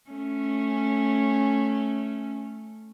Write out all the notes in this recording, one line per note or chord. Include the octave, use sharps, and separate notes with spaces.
A3 C#4